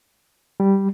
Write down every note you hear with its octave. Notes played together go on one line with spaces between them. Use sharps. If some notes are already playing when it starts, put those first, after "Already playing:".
G3